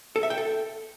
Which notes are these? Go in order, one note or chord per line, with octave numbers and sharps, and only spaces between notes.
A4
E5
G5
A4